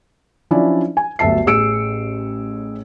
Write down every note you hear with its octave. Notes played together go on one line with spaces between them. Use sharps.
F3 F#3 C#4 D4 E4 D5
G#5
G1 D2 F#3 E5 A5 C7
A1 A2 G#4 E6 C#7 D7